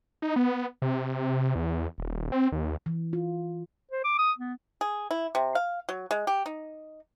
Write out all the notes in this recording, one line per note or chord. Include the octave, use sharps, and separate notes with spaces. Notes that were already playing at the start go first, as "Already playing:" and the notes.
D#4
B3
C3
E2
D#1
C4
D#2
E3
F4
C5
D6
D#6
B3
G#4
E4
C3
F5
F#3
G#3
G4
D#4